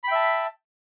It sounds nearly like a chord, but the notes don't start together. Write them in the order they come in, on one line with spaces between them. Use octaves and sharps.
B5 G5 E5 A5